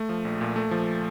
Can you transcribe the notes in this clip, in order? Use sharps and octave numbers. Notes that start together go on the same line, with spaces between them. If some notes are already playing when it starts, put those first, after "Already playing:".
Already playing: A3
F3
A#1
A#2
A3
F3